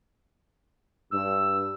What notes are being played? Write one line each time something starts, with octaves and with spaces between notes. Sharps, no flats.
G2 E6